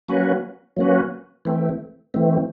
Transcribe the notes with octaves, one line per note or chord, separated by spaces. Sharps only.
F#3 A#3 C#4 F#4 B4
F#3 A#3 C#4 F#4 B4
E3 A3 C4
E3 A3 C4